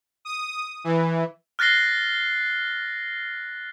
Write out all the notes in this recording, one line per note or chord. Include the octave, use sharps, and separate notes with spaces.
D#6
E3
F6 F#6 A6 A#6 C7 G7